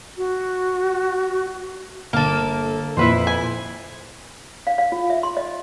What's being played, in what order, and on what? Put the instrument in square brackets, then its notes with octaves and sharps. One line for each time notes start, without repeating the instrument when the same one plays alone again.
[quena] F#4
[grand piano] G1 [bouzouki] A#3 A4
[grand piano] F2 A#2 [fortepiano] E4 B4 C5
[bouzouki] G#5
[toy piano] F5
F5
F4
E5
C6
D#5